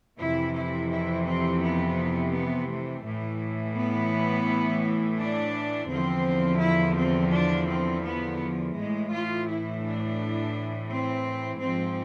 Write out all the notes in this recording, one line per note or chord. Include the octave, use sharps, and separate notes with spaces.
F2 C3 E3 E4
E4
E4
C4
B3
B3
A3
A2 E3
B3
D4
E2 D3 F3 C4
E4
C4
D4
C4
B3
F3
A2 E3 G#3
F4
E4
D4
C4
G#2 F3 C4